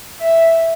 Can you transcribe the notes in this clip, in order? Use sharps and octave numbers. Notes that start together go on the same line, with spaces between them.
E5